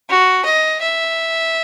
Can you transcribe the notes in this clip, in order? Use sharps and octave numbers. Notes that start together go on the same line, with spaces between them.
F#4
D#5
E5